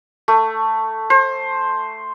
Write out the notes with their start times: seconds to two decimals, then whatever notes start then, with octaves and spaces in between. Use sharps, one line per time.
0.28 A3
1.10 C5